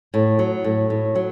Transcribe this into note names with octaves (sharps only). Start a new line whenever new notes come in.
A2
F#3
A2
A2
F#3